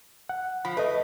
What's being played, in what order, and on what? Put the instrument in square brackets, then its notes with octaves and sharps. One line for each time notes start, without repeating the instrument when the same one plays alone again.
[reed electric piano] F#5
[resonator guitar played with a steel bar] F3 [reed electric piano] B5
[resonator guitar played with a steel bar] A3 [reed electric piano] B4 D#5